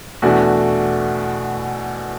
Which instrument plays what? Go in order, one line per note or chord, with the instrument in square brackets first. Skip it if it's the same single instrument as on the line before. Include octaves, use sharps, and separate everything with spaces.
[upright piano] E2 B2 A3 D4 F#4